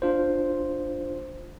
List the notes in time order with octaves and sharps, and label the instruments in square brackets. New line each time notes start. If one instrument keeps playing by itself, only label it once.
[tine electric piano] D4 F4 C5